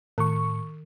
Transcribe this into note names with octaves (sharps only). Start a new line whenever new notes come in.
A2 D#3 C#6